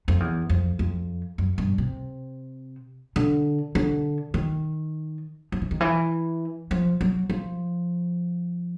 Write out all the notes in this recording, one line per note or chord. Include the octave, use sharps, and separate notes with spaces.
F2
E2
F2
F2
F#2
G2
C3
D3
D3
D#3
F3
E3
D#3
E3
F3
F#3
F3